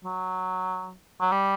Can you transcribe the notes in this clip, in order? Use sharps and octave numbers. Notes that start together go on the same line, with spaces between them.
F#3
F#3
G3